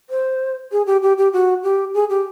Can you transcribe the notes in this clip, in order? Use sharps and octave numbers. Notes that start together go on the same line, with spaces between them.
C5
G#4
G4
G4
G4
F#4
G4
G#4
G4